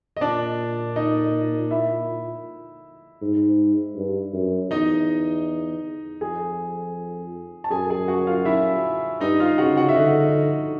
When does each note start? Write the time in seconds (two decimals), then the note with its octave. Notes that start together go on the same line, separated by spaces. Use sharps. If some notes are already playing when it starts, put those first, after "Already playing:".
0.17 D#5
0.21 A#2 D4 D5
0.96 D#4 D#5
1.71 E4 E5
3.22 G#2
3.96 G2
4.33 F#2
4.71 E2 D#4 D#5
6.21 F2 G#4 G#5
7.64 A5
7.71 F#2 G#4 G#5
7.90 G#4 G#5
8.08 F#4 F#5
8.27 F4 F5
8.45 E4 E5
9.21 G2 D#4 D#5
9.40 F4 F5
9.58 C#3 F#4 F#5
9.77 F#4 F#5
9.89 E5
9.96 D3 D#4 D#5